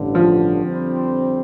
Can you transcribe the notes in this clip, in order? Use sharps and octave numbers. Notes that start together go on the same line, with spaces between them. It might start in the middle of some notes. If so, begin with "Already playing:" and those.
Already playing: A1 G2 D3
F3
F2 D3 G3 C4